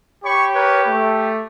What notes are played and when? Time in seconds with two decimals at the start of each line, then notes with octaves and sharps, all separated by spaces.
0.24 G4 C#5 B5 C#6
0.54 A#4 B4 C#5
0.87 A3